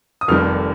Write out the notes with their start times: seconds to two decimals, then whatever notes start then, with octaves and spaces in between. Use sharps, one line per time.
0.21 D#6
0.28 F1 F2 D#3 G3 F6